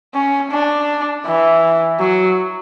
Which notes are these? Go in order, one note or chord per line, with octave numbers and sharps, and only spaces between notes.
C#4
D4
E3
F#3